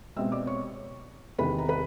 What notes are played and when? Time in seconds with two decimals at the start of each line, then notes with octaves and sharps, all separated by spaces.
0.16 B2 G#3 C4 E5 E6
0.32 D5 D6
0.47 C#5 C#6
1.38 E2 C3 D#3 B4 B5
1.58 A#5
1.69 B4 B5